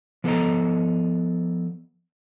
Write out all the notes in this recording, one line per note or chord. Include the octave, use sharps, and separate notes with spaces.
F3 B3 A4 A#4 D#5 A#5